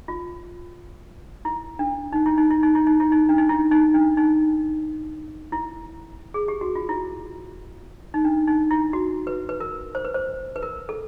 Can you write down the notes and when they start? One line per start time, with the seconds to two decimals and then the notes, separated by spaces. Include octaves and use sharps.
0.08 F4
1.45 E4
1.79 D4
2.13 D#4
2.26 E4
2.38 D#4
2.51 E4
2.63 D#4
2.75 E4
2.87 D#4
3.00 E4
3.12 D#4
3.29 D4
3.38 D#4
3.49 E4
3.71 D#4
3.94 D4
4.17 D#4
5.52 E4
6.34 G#4
6.48 G4
6.61 F#4
6.75 F4
6.89 E4
8.14 D#4
8.25 D4
8.48 D#4
8.71 E4
8.93 F#4
9.27 B4
9.49 B4
9.60 A#4
9.95 C5
10.05 B4
10.14 C5
10.56 B4
10.62 A#4
10.89 A4